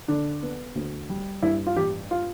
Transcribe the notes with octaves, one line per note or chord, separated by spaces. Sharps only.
D3 D4
B3
D2
G3
G2 E4
F4
A1 G4
F4